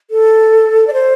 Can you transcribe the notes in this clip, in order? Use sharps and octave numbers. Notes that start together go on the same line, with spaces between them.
A4
D5
C5